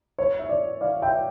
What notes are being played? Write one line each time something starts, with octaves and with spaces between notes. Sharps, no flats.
C#5
E5
D5
D5 F5
E5 G5